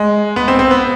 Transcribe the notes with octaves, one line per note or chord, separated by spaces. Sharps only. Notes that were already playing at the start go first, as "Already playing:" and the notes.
Already playing: G#3
B3
C4
C4
B3